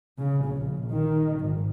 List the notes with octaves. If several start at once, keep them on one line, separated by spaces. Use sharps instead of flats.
C#3
A#1
D#3
G#1